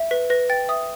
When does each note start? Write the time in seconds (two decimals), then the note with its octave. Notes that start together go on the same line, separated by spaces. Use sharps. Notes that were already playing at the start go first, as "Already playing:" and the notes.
Already playing: E5
0.11 B4 B6
0.30 B4 A#6
0.50 G5 A6
0.69 E5 D#6